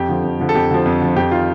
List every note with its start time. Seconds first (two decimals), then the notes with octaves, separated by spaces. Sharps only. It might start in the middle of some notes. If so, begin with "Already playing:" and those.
Already playing: F2 G4
0.09 D3 F3
0.24 F2
0.39 D3 F3
0.49 A4
0.55 F2 G4
0.71 D3 F3
0.86 F2
1.01 D3 F3
1.16 F2 G4
1.31 D#3 F4